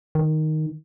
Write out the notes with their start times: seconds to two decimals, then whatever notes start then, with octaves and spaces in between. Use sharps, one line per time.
0.15 D#3